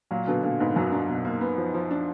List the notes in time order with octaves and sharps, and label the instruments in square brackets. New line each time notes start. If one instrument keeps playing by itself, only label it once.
[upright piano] A#2 [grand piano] F#3
[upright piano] B2 [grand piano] D3
[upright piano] A#2 [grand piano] D3
[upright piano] G#2 [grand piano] B3
[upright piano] F#2 [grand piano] F#3
[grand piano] D4
B2
A#3
B3
F3
F3
D4